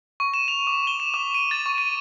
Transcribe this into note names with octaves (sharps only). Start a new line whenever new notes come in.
C#6
E7
F7
D6
G7
E7
D6
D#7
A6
C#6
D#7